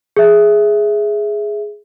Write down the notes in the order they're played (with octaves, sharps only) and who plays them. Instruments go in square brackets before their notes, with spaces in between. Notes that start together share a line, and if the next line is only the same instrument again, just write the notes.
[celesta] G#4 E5